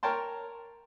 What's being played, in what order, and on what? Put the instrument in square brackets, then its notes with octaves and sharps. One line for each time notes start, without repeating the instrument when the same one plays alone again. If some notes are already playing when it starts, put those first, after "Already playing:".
[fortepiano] A#4 C#5 G5 A5 C6